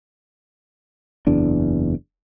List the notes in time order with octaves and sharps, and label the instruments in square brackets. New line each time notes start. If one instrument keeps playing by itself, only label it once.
[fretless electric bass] F#1 E2 D4